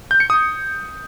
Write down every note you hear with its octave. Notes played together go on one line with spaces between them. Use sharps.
G6
C#7
D#6